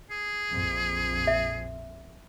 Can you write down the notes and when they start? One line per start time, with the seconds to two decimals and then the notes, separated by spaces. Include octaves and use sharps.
0.11 G#4
0.51 A#1 F2
1.27 E5